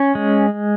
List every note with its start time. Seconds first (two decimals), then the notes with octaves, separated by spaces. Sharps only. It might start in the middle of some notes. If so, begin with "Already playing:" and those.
Already playing: C#4
0.15 G#3